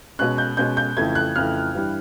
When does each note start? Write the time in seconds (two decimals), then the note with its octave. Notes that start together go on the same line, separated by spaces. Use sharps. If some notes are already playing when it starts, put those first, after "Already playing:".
0.19 B2 G#3 C#4 F#6
0.38 G6
0.57 B2 G#3 C#4 G6
0.77 G6
0.97 F2 C#3 E3 A3 G#6
1.15 F#6
1.36 F2 C#3 E3 A3 F6
1.74 G2 E3 G3